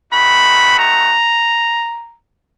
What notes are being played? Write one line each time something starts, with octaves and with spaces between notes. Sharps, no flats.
A3 C4 D#4 F#4 B5
A#5